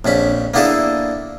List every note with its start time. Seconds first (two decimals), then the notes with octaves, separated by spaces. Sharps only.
0.05 A#1 F2 C#4 B5
0.54 A#3 B3 D4 E4 G#4 A4